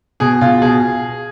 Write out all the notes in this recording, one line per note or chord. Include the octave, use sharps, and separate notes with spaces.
B2 G#4
B2 F4
B2 G#4